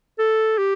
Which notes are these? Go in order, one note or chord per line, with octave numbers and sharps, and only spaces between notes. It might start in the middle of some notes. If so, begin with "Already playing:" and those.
A4
G4